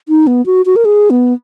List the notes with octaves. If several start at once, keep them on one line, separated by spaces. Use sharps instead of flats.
D#4
B3
F#4
F#4
A#4
G#4
B3